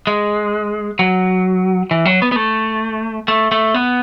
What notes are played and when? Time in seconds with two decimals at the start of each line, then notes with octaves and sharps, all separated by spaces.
0.07 G#3
0.99 F#3
1.91 E3
2.05 F#3
2.22 B3
2.32 B3
2.36 A3
3.28 A3
3.52 A3
3.74 B3